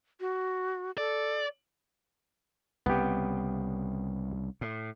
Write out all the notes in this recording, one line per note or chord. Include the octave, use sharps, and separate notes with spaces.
F#4
A4 D5
C2 C#3 B3 G4
A2